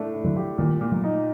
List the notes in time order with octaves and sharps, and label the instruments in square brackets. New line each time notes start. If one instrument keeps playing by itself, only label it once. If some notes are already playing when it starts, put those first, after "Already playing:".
Already playing: [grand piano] A2 A3 D4
A2
[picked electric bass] D3 F#3
[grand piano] G4
[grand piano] A#2 [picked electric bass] D#3 G3
[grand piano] A#2
[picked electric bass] F#3 A3
[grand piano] D#4